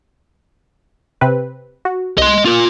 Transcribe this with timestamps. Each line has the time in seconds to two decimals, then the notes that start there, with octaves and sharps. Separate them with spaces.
1.21 C3 C4 B4
1.85 F#4
2.18 C2 D#5 C6
2.45 F4 A#4